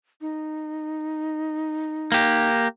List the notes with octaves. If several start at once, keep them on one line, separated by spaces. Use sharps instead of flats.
D#4
A#3 G4